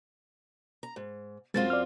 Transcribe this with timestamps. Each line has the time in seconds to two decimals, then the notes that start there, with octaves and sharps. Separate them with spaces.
0.83 A#5
0.96 G#2
1.54 F#2 G#3 C4 F4 A6
1.70 D5 F6